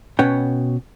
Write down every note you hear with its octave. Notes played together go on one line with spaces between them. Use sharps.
B2 C#4 B4 C#5 F#5 G5